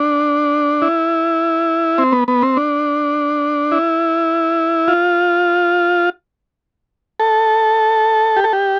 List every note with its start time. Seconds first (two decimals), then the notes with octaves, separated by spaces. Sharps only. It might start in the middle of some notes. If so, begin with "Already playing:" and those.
Already playing: D4
0.82 E4
1.98 C4
2.12 B3
2.28 B3
2.42 C4
2.57 D4
3.72 E4
4.88 F4
7.20 A4
8.37 G4
8.44 A4
8.53 G4